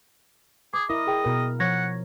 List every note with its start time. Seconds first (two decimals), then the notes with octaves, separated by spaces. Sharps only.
0.74 G#4 D6
0.90 E4 A#4 D#5
1.07 G#4 G5
1.25 B2 A#4
1.60 F3 C#5 F#5 C#6 G#6 A#6